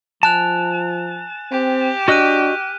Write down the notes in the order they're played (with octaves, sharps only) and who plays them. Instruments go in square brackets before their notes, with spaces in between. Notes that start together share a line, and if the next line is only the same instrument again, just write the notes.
[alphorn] F3 [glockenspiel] G#5 F#6 F7 [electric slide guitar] A5
[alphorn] C4 [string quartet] G4
[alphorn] D4 [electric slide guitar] F#4 D#5 [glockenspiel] F6 F#6 D#7